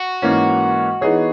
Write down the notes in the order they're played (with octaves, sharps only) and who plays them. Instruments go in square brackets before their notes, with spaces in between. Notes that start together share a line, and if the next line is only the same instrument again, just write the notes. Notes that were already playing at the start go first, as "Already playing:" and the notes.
Already playing: [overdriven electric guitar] F#4
[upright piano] G#2 E3 A#3 C#4
E3 B3 D#4 G#4 C#5